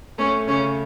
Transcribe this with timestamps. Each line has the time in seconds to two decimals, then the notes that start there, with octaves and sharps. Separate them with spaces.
0.18 A3 C#4
0.47 C#3 C#4